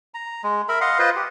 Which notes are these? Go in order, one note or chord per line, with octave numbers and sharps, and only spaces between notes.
A#5
G#3
A#4 E5 B5
D#5 F5 F#5 C6
F4 B4 C5 D#5
G4